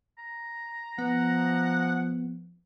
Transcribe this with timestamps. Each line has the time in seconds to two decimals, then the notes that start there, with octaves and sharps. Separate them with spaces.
0.18 A#5
0.99 F3 B3 F#5